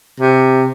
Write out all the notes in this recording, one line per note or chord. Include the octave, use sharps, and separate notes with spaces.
C3